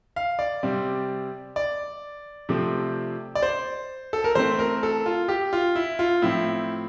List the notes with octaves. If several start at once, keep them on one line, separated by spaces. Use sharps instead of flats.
F5
D5
C3 G3 C4
D5
C3 F3 A3 C4
D5
C5
A4
A#4
E3 A3 C4 C5
A#4
A4
F4
G4
F4
E4
F4
A2 F3 C4 E4